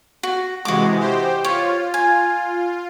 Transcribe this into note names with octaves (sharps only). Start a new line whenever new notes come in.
F#4
C3 E3 G#3 F#4 D6
G4 C5
F4 C#5
F4 G#5